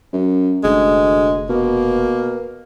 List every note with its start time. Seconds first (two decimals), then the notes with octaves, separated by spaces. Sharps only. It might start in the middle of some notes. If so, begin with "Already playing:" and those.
0.13 F#2
0.64 F1 D2 G#3
1.50 B2 A#3